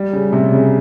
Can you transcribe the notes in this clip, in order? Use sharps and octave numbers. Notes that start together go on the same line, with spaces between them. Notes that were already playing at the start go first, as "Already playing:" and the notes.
Already playing: G3
C#3
C3
C#3